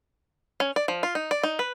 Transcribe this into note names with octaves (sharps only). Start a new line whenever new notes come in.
C#4
D5
F3
F4
D#4
D5
D#4
B4